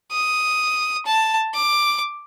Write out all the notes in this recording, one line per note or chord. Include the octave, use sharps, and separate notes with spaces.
D#6
A5
D6